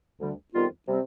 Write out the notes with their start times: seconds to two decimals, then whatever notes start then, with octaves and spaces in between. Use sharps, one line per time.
0.21 D2 D3 G3
0.54 F2 D#3 G3 B3 F4
0.88 C3 G3 C4